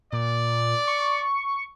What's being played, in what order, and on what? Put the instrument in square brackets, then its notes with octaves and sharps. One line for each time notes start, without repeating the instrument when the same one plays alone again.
[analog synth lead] A#2 [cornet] D5
[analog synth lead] C#6